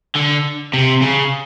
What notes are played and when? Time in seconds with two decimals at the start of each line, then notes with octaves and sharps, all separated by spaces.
0.15 D3
0.74 C3
1.02 C#3